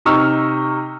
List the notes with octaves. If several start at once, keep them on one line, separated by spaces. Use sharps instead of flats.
C3 D#4 C#6 E6 F6